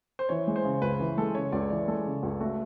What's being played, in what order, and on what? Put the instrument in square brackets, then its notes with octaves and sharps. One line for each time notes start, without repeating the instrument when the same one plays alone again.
[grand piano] C5
[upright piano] E3 [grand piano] C#5
[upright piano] G#3
[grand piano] C5
[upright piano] C#3
[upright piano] C#2 [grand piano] B4
[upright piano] E3
[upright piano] G#3 [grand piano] A4
[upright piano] C#3 [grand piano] C#5
[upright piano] C#2 [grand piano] D5
[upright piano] E3 [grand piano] D5
[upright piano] G#3 [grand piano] A4
[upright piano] C#3
C#2
[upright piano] A3 [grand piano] F#4